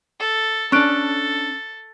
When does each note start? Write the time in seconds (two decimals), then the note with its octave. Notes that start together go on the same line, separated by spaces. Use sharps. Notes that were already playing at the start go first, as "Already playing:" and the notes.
0.19 A4
0.72 C#4 D4 A4 C#6 F#6 D7